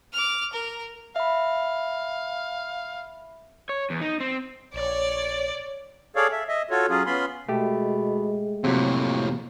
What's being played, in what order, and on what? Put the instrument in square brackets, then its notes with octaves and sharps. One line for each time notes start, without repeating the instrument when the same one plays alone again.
[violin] D6 F6
A#4
[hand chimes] E5 B5 [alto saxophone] F5
[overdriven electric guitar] C#5
E2
D#4
C4
[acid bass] A#1 [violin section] C#5 [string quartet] D5
[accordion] G#4 A4 C#5 D5 F5
E5
D#5 E5
F4 F#4 A4 C#5
F#3 C#4 F4 G#4
B3 C#4 F4 B5 C6
[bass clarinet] B2 [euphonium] G#3 [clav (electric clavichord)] A3 G4
[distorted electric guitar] F2 A2 [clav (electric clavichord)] C3 F#3 [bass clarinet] A#3